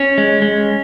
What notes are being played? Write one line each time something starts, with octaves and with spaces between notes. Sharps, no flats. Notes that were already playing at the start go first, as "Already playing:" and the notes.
Already playing: C#4
G#3
G#3